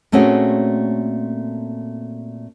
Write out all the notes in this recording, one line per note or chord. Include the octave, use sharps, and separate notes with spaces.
A#2 A3 C4 C#4 F#4 G#4